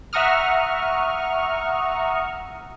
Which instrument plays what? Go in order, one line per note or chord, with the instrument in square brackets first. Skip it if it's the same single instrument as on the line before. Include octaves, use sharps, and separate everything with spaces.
[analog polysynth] E5 F#5 A#5 C#6 D#6 F6